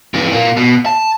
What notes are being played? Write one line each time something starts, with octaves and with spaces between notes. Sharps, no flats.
F2 E3
A#2 A#3
B2
A5